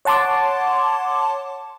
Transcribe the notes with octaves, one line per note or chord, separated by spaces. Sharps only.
C#5 F#5 A5 C6 D6